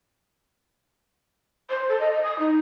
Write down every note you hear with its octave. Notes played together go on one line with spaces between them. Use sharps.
C5
A4
D#5
D#5
D#6
D#4